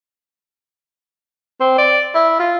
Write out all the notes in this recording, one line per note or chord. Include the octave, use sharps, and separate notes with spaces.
C4
D5
E4
F4